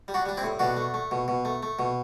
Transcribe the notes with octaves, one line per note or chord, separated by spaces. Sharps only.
G3
D4 F#4
G3 D4
C4 E4
A2
B2 D4 F#4
A3
A3
B2
B2
A3
A3
B2